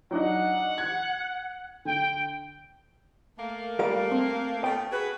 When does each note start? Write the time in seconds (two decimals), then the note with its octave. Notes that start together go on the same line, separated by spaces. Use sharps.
0.11 F#3 D4 D#4 F#5
0.78 G#6
1.85 D3 G5
3.38 A3 A#3
3.79 G3 A#4 F5
4.12 C4
4.64 A3 B3 C#4 G5
4.92 F#4 G#4 B4